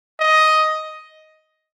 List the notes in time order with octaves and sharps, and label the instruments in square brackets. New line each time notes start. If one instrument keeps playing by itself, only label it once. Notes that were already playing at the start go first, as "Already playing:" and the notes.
[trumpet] D#5